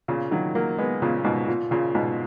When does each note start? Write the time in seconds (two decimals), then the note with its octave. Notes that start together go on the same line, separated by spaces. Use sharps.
0.08 A#2 C#3
0.31 D#3 F#3
0.55 F#3 A#3
0.78 G#3 B3
1.02 A#2 C#3
1.24 G#2 B2
1.48 A#2
1.71 A#2 C#3
1.95 G#2 B2